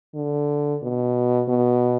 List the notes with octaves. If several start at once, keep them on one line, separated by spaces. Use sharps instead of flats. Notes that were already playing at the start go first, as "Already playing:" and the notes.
D3
B2
B2